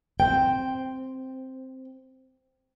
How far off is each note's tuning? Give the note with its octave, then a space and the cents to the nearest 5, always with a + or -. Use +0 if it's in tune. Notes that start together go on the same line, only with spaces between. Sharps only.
C4 +0 G5 +0